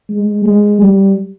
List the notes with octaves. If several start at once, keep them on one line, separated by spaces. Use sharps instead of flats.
G#3
G#3
G3